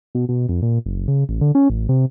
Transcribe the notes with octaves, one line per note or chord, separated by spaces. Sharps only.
B2
B2
F2
A#2
F#1
C#3
A1
D3
C#4
A1
C3